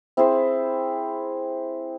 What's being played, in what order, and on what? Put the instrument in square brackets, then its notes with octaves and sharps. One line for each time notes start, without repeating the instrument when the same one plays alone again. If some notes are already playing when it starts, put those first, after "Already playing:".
[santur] C4 E4 G#4 C5